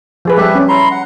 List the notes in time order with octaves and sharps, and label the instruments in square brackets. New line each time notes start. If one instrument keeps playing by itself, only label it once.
[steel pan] F3 G#4 B4
[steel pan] G3 A4 [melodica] G4 B4 E5
[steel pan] C#4
[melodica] E4 A#5 C6
F#5